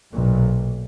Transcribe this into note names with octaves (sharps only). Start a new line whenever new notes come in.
B1 A#2